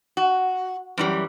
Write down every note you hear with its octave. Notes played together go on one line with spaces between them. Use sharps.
F#4
F#2 E3 G3